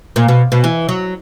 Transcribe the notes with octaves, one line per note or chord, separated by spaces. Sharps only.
A#2
B2
B2
E3
F#3